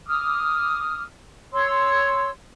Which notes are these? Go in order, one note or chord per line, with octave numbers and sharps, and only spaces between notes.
D6 D#6 F6
C#5 C6 E6